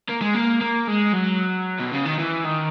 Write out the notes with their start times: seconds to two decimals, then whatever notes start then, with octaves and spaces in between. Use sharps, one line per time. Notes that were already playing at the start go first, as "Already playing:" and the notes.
0.09 A#3
0.22 G#3
0.35 A#3
0.61 A#3
0.88 G#3
1.13 F#3
1.79 B2
1.92 C#3
2.05 D#3
2.18 E3
2.44 D#3